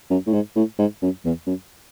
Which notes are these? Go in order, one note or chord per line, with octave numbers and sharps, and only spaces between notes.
F#2
A2
G#2
A2
G#2
F#2
E2
F#2